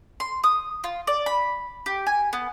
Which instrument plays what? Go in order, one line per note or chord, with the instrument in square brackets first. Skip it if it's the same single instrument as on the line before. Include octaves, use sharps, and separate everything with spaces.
[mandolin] C6
D#6
F4
D5
B5
G4
G#5
B3